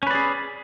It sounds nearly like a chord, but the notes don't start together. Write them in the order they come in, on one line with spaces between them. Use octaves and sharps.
C#4 B4 D5 G#4